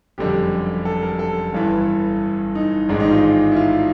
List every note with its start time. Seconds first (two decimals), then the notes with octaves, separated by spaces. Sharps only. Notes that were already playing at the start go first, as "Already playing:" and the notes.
0.18 F#1 F2 D3 G3 G4
0.85 A4
1.03 A#4
1.19 A4
1.53 G1 G2 E3
2.55 D#4
2.89 A1 G#2 D#3 G#3 D4
3.00 D#4
3.11 F4
3.52 E4
3.56 F4